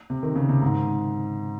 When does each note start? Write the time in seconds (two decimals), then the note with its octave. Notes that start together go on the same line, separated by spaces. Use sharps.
0.10 C3
0.23 D#3
0.36 C#3
0.49 C3
0.62 G#2